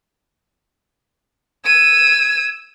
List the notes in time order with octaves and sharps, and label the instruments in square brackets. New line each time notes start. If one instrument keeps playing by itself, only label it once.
[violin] E6 D#7 [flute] G#6